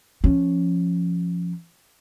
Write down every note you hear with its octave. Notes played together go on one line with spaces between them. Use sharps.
F3 C#4